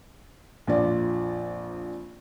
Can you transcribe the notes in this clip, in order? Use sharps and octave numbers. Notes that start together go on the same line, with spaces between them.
A#1 F2 F4 D5